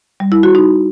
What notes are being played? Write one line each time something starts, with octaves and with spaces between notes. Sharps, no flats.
G3
E4
F#4
D#4